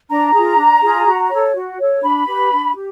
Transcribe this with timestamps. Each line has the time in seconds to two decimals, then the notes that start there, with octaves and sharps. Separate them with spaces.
0.09 D4 A#5
0.33 F4 G#4
0.57 D4
0.82 F4 G#4
1.06 F#4
1.30 A4 C#5
1.54 F#4
1.79 A4 C#5
2.03 D4 B5
2.27 G4 B4
2.52 D4
2.75 G4